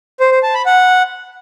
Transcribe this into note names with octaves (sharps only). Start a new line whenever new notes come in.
C5
C5
A5
B5
F#5